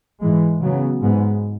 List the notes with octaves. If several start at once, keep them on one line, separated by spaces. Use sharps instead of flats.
G#2 E3 G#3
C#3 F#3 B3
G#2 G#3 B3